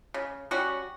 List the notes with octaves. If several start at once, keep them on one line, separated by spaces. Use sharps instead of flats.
C#3
G3 C#4 F#4